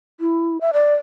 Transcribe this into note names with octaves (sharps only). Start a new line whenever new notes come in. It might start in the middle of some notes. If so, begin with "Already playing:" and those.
E4
E5
D5